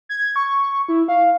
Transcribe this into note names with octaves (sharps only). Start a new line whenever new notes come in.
G#6
C#6
E4
F5